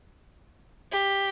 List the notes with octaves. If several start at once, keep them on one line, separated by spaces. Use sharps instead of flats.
G4